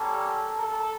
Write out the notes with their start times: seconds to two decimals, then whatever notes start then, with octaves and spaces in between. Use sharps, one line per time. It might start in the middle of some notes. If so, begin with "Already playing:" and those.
Already playing: G3 A#3 C#4 A4
0.59 A4